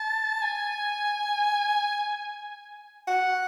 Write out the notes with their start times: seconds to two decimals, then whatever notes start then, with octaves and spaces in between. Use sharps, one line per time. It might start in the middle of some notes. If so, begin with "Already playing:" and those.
Already playing: A5
0.42 G#5
3.08 F#5